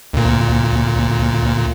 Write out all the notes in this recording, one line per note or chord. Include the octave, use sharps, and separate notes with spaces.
D2 A#2